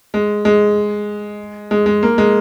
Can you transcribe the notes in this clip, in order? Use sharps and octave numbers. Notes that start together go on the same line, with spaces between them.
G#3
G#3
G#3
G#3
A#3
G#3